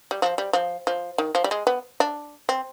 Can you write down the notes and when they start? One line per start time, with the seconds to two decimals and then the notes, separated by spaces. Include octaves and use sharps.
0.11 G3
0.22 F3
0.38 G3
0.53 F3
0.87 F3
1.18 D#3
1.35 F3
1.44 G3
1.51 G#3
1.67 B3
2.00 D4
2.49 C4